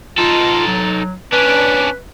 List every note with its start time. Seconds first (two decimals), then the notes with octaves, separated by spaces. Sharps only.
0.18 D#4 F4 A4
0.67 F#3
1.33 C#4 D4 B4